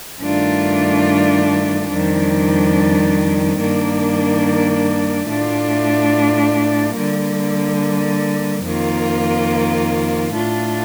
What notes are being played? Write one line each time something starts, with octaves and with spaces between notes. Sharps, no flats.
G2 D#3 A3 D4 F4
F2 D#3 G3 D4
G2 D#3 A#3 D4
A2 A3 D4 F4
D3 G3 A#3
F2 D#3 A#3 F4
A2 A3 D4 F4